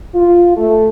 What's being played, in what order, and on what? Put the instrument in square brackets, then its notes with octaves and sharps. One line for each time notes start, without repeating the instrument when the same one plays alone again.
[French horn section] F4
A3